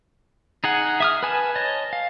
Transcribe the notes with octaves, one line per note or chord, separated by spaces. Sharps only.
D#4 G#4 F#5
E5 D#6 F6
B4 G#5 A5
C#5 D#5 A5
F5